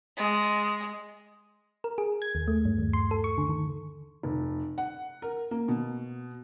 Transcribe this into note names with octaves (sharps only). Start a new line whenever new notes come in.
G#3
A#4
G#4
G#6
D#2
A3
G2
D#2
C6
A4
C#6
D3
D#3
F1
F#5
A#4
A#3
B2